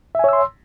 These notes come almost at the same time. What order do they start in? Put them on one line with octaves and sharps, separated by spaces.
E5 G#5 C#5 E6 C6